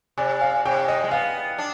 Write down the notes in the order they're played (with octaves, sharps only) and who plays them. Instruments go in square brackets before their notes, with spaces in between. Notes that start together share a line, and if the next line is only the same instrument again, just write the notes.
[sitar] C3 [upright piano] D5
[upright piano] F5
[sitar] C3 [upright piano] G5
[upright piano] D#5
[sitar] G#3
[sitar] B3 [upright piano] F5
[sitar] D4